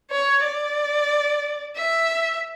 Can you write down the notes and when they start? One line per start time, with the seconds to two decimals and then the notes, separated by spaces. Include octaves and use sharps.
0.11 C#5
0.44 D5
1.77 E5